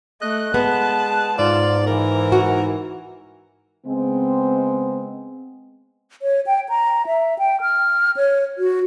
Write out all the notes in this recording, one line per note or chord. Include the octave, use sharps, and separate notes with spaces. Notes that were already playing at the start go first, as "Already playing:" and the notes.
A3 D#5 F#6
G#3 B3 A5
G#2 F4 D5
E3 A#4
F#4
C#3 G#3 B3 C4
C#5
G5
A#5
E5
G5
F6
C#5
F#4